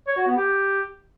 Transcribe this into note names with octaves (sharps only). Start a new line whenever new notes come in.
C#5
F#4
B3
G4